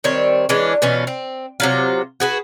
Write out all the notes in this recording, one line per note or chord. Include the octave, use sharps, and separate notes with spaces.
D#3 G3 C4 C#5
E3 G#3 C#4 D4
B2 E3 C#4 F4
C4
C3 F#3 F4
F#4 G#4 B4